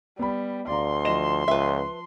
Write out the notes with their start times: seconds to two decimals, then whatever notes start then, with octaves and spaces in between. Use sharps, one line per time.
0.19 G3 B3 B5
0.68 D2 D5 F5 A#5 C6
1.05 F3 D#5 A5 E7
1.48 C#2 B4 E5